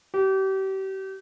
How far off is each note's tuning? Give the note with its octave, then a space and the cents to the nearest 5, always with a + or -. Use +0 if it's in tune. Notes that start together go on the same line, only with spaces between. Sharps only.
G4 -35